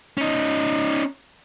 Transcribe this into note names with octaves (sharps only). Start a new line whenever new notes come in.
C#4 D#4